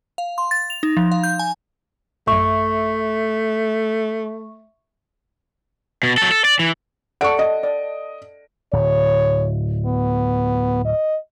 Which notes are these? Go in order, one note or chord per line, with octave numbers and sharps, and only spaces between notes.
F5
C6
A6
F7
D#4
F3
F5
G6
G#5
A1 F#2 A3 E5 C#6
B2
F#3 A4
A4
D5
E3
A4 D5 F#5 C#6 D7
D#5
D5
D1 C#5
B3
D#5